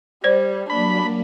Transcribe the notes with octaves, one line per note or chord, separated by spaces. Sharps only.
G3 C5 D5
F#3 A#3 D4 B5